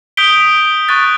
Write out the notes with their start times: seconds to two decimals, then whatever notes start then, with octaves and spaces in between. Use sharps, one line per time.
0.17 D#6 G6 B6 D7 G7
0.89 C#6 F#6 A6